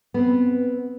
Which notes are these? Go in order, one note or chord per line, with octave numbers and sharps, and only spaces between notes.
B3 C4